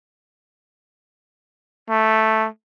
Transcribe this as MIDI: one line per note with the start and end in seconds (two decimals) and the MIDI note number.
1.90 2.47 57